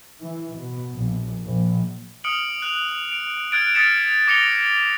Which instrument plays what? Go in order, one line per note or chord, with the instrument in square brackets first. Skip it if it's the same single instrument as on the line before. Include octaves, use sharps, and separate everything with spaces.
[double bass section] E3
B2
A#1
A#1
[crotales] D#6 F6 C#7 D7 F#7
F#6 F7
D7
F6 F#6 G#6 A6 D7
D#6 F6 A6 B6 C#7 E7
D6 A#6 C#7 F7 G7